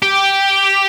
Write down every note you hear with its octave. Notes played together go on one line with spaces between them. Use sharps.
G4